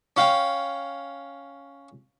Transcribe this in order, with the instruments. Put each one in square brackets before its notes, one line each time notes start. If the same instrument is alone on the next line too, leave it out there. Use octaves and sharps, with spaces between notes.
[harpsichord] C#4 F5 G5